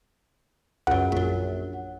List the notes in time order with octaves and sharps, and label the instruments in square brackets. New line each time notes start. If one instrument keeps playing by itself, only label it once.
[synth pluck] C#2 F#2 [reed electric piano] F#5
[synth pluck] A#1 F#2